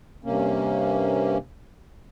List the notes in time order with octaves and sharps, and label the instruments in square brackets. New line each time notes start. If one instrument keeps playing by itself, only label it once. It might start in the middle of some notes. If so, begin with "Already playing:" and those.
[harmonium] G2 C3 A#3 C#4